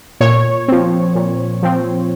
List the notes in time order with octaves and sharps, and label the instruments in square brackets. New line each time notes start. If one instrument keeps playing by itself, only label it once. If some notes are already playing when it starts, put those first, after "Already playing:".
[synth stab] A#2 C#5
F3 C4
A#2
F3 C4